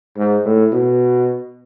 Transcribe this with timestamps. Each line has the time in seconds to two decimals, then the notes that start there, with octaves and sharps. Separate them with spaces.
0.17 G#2
0.45 A2
0.73 B2